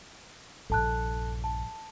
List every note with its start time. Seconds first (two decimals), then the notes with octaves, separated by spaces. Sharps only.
0.70 A#1 G2 A4 A5 F#6
1.44 A5